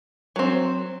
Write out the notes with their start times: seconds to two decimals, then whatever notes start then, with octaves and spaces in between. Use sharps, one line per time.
0.36 F#3 C4